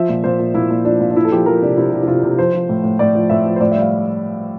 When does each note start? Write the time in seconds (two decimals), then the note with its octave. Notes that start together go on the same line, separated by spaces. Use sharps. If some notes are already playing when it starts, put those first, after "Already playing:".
Already playing: F3 E5
0.09 A#2
0.24 A#2 C5
0.39 A#2
0.54 A#2 E4
0.71 A#2
0.85 F3 D4
1.00 A#2
1.11 D4
1.15 F3 E4
1.25 A4
1.32 F3 G4
1.46 F3 A#4
1.62 C3 D4
1.77 C3 E4
1.92 C3
2.02 E4
2.07 C3 F4
2.23 C3
2.38 F3 C5
2.53 F3
2.69 A2
2.84 A2
2.99 A2 D5
3.15 F3
3.29 A2 E5
3.45 F3
3.56 C5
3.60 A2 D5
3.72 G3 E5
3.81 F5